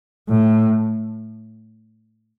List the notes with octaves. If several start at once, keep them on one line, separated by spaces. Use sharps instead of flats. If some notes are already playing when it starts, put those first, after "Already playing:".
A2